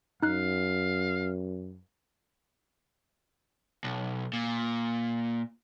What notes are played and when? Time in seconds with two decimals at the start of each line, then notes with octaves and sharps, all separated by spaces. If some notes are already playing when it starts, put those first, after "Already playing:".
0.23 F#2 D#4 F5 F#6
3.84 B1
4.33 A#2